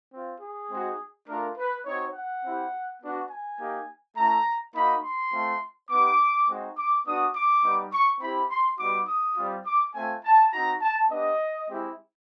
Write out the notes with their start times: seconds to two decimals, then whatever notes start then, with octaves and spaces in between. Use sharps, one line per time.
0.13 C4 F4
0.41 G#4
0.71 G#3 C4 D#4 F#4
1.28 A3 D4 F4 A#4
1.58 B4
1.86 C4 D#4 F#4 C#5
2.14 F#5
2.44 C4 E4 G4
3.02 B3 D4 F#4
3.30 G#5
3.59 A#3 D#4 G4
4.17 A3 C#4 E4 A#5
4.75 A#3 D#4 F#4 B5
5.04 C6
5.33 A3 C4 F4
5.90 B3 D#4 G4 D6
6.48 G#3 C4 D#4 F#4
6.77 D6
7.06 B3 D4 F#4 D#6
7.35 D6
7.64 G3 B3 D#4
7.93 C#6
8.21 C4 E4 G4 B5
8.50 C6
8.79 G3 B3 D#4 F#4 D6
9.08 D#6
9.36 G3 C4 F4
9.66 D6
9.95 A3 C4 F4 G#5
10.24 A5
10.52 C4 D#4 F#4 A#5
10.81 A5
11.10 B3 D4 G4 D#5
11.68 G#3 C4 E4 G4